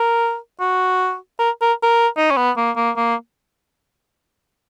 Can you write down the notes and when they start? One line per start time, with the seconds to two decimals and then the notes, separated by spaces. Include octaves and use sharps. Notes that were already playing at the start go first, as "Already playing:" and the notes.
Already playing: A#4
0.60 F#4
1.39 A#4
1.61 A#4
1.83 A#4
2.17 D#4
2.31 C#4
2.37 B3
2.57 A#3
2.77 A#3
2.97 A#3